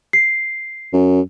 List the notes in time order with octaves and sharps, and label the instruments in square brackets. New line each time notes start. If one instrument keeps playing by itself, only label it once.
[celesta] C7
[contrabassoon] F#2